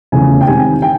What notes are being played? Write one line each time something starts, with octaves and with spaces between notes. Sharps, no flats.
E2 C#3 F3 A3 G#5
G5
C3 D#3 G#3 C4 G#5
G5